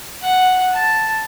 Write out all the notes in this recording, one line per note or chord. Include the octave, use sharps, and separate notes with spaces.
F#5
A5